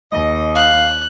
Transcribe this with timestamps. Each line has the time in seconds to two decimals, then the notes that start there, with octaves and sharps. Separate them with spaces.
0.13 D#2 D#5
0.55 F5 F#6